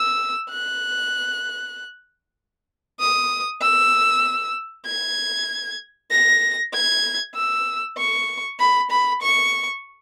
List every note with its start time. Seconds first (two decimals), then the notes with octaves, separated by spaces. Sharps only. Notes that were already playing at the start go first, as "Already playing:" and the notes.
Already playing: E6
0.50 F#6
3.00 D#6
3.61 E6
4.86 G#6
6.11 A#6
6.73 G#6
7.35 E6
7.97 C#6
8.59 B5
8.91 B5
9.22 C#6